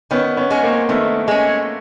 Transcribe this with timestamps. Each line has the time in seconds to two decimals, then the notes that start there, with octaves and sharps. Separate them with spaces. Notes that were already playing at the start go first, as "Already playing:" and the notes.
0.11 D#3 B3 C#4
0.37 B3 C#4
0.51 G#3 C#4
0.63 A#3 C4
0.89 D#3 A3 B3
1.28 G#3 C#4